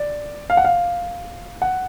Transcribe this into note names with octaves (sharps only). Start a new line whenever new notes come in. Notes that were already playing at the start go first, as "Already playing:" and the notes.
Already playing: D5
F5
F#5
F5
F#5